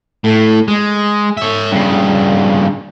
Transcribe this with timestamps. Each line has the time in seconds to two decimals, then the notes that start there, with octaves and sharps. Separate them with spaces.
0.24 A2
0.68 G#3
1.37 C#5 E5
1.72 G2 C#3